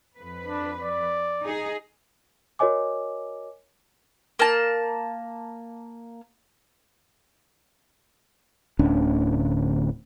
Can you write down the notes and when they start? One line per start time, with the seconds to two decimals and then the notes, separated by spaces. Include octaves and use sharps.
0.16 F2 B4
0.45 D4
0.82 D5
1.43 D#4 G#4
2.59 F#4 A#4 C#5 D#5 G#5 D6
4.39 A#3 A5
8.79 D1 D2 C#4 D4